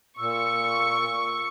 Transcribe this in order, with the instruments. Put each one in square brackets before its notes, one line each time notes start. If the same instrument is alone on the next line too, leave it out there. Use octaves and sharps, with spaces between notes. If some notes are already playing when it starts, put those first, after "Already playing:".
[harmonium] A#2 [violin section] C#6 [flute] E6